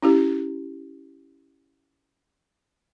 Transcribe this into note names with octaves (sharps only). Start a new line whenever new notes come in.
C#4 E4 G4